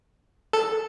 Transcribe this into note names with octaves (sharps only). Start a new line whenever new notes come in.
A4